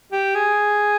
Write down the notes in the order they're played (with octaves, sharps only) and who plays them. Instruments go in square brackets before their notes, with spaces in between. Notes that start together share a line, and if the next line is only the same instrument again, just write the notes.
[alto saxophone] G4
G#4